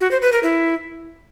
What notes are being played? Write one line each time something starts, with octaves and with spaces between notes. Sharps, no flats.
F#4
C5
B4
A#4
E4